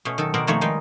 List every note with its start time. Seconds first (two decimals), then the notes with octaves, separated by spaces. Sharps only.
0.05 B2 A3 C#4
0.18 D#3 F#3 A4
0.34 B2 C4 F#4 A#4 D5
0.47 F2 D#3 A3 A#3 E4 C#5
0.61 D#3 G3 G#3 D#4